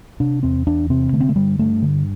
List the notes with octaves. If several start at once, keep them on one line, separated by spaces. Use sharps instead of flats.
C3 D4
E2 C4
E2 D4
C3 C4
D3 A3
C4
A3
G2 G3
G2 A3
D3